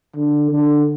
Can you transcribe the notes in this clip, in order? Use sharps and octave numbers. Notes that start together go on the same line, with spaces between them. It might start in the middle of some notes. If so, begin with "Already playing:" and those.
D3
D3